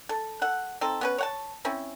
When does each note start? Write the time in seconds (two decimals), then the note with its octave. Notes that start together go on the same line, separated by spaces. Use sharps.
0.09 A4
0.42 A4 F#5
0.81 C4 D#4 A4
1.01 B3 C#4 B4
1.18 C#5 F#5 A5
1.65 C4 C#4 E4